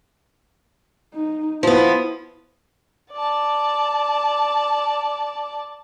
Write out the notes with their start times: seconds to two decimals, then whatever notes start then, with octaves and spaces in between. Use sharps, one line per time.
1.14 D#4
1.63 F3 B3 E4
3.13 D5 A5